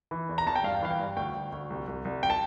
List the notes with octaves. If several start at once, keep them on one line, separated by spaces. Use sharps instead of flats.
E3
E2
A#5
E2 A5
G5
G2 F5
E3 F5
G5
G2
D2 G5
D2
D2
C2
C2
C2
G5
A5